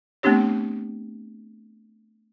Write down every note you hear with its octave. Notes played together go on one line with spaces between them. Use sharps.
A3 B3 C4 D4 G4 C#5